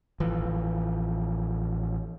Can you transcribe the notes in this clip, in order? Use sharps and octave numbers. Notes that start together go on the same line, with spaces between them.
A1 E3 F3